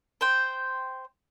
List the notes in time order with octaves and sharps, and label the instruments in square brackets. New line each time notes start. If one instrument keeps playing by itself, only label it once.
[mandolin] C5 G5